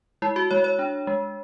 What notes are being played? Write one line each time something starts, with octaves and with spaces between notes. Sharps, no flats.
G#3 E4
F#4
G#3 C#5
C#5
D4
G#3